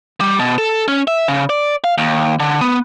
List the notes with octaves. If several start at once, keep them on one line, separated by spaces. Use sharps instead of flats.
G3
B2
A4
C#4
E5
C#3
D5
F5
D#2
D3
B3